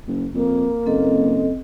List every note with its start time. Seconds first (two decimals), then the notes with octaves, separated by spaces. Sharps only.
0.07 F#1
0.34 F2 A#3
0.86 F#1 C4 A4 D#5